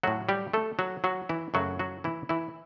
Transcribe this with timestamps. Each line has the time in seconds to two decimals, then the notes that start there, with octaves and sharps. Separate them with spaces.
0.03 A2 F#3 A3 F#4
0.29 G3 G4
0.53 A3 A4
0.79 F#3 F#4
1.04 F#3 F#4
1.29 E3 E4
1.54 F#2 C#3 F#3 A3 F#4
1.79 F#3 F#4
2.04 E3 E4
2.29 E3 E4